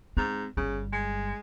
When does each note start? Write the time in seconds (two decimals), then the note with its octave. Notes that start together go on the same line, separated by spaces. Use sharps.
0.17 G#2 C4
0.57 G1 C#3 G3
0.92 G#3